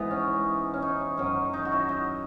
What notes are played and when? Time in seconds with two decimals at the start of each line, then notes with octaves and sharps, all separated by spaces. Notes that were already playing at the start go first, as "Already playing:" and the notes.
Already playing: G#2 E3 B3 D#4
0.11 C#4
0.74 C#4
0.82 D#4
1.17 F#2 D#3 F#3
1.53 D#4
1.65 F#4
1.72 E4
1.89 D#4